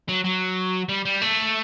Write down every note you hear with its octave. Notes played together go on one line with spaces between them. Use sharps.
F#3
F#3
G3
G3
A3